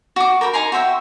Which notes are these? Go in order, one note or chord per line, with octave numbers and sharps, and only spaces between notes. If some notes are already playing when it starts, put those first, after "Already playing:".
F#4 D6
A#4 G5 A5 B5
D#4 G#5 A#5 C6
F#4 C5 E5 G5